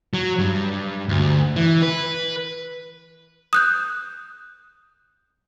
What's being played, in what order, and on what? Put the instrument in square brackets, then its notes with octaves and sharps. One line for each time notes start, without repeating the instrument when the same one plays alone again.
[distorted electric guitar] F#3
G2
D2
E3
B4
[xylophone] D#6 F#6 G6